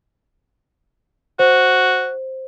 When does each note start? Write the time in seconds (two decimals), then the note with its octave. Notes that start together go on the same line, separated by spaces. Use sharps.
1.39 F#4 C5